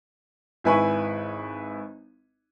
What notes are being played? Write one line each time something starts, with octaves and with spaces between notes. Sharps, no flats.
G#1 E4 B4 G#5 B5 C#6